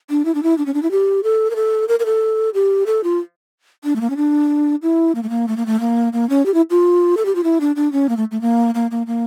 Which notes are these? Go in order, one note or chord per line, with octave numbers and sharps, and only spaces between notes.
D4
E4
D4
E4
D4
C#4
D4
E4
G4
A4
A#4
A4
A#4
A#4
A4
G4
A4
F4
D4
A3
A#3
C#4
D4
E4
A#3
A3
A#3
A3
A#3
A3
A#3
A#3
C#4
G4
E4
F4
A4
G4
F4
E4
D4
D4
C#4
A#3
A3
A3
A#3
A#3
A#3
A#3